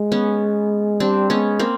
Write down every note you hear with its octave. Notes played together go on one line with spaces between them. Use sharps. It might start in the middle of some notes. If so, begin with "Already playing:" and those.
Already playing: G#3
B3 C#4
G3 C4 D4
G#3 B3 C#4
A#3 C4